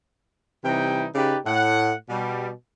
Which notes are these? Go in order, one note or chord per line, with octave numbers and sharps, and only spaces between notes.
C3 E3 G3 D#4 E4 G5
C#3 D#4 G4 B4 D5
A2 F#5
B2 G3